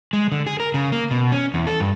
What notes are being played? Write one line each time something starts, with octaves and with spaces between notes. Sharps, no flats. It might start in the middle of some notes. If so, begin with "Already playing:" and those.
G#3
D3
G#4
A#4
C#3
A#3
B2
C#4
E2
A4
G2